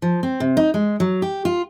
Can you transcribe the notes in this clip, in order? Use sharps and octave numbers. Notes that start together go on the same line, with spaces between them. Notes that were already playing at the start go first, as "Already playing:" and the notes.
F3
C4
C3
D#4
G#3
F#3
G4
F4